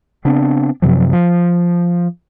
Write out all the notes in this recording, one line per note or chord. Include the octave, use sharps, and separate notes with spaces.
C#3 B3 C4 D4
F#2 C3 F3 F#3
F3